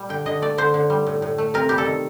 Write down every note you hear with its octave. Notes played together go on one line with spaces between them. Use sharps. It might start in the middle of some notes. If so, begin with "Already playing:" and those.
Already playing: A#2 G3
D3 G5
D3 D#5
A3 D5
D3 C5
D3
G3
A2
A2
A3
C3 A#4
G3 G4
A4
D#3